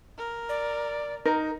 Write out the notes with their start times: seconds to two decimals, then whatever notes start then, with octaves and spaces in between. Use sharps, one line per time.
0.18 A#4
0.49 D5
1.25 D#4 A#4